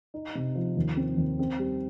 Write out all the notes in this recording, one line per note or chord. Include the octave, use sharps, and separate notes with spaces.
D#4
C3
F3
D#2
C4
D#2
C4
G3